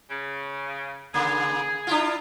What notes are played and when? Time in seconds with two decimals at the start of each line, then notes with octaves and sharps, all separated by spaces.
0.10 C#3
1.14 C#3 A#3 G#4
1.87 D4 E4 F4